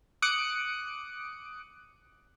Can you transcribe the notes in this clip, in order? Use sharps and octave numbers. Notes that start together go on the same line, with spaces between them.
D6 D#6 F#6 C#7 D7